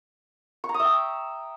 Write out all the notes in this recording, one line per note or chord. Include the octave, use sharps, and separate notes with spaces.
C#6
A#5
D#6
E5
G5